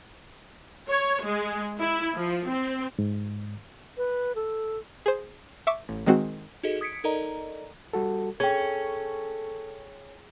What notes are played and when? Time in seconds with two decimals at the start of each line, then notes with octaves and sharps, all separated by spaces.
0.90 C#5
1.23 G#3
1.79 E4
2.16 F3
2.49 C4
2.99 G#2
3.97 B4
4.35 A4
5.06 G#4 C5
5.67 E5 C#6 D6
5.89 A1
6.06 D#3 G#3 C4 F#4
6.63 D#4 F#4 G#4 A4 D#5
6.81 D#6 G#6 B6 C#7 D7
7.04 D#4 A4 A#4 D5 D#5 A#5
7.93 G3 F#4 A4
8.40 C#4 G#4 A4 G5 G#6